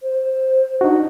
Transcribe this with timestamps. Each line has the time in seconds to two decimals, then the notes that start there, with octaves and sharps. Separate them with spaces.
0.01 C5
0.81 D4 D#4 F#4